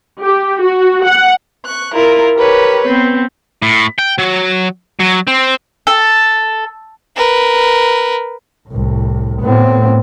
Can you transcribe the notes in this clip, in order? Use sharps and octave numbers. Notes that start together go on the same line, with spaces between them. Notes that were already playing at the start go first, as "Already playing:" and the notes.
G4
F#4
F#5
C#6 F#6
E4 F4 A#4
G4 A#4 B4 C#5
B3 C4
A2
G5
F#3
F#3
C4
A4
A#4 B4
C2 A2
A2 B3 C4